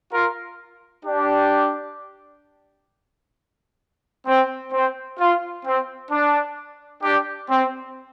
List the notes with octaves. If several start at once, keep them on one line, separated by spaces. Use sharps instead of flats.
F4 A#4
D4 G4
C4
C4
F4
C4
D4
D4 G4
C4